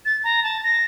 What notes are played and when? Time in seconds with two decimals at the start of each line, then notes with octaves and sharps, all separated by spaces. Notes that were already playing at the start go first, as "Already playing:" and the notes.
0.05 A6
0.24 A#5
0.43 A5
0.64 A#6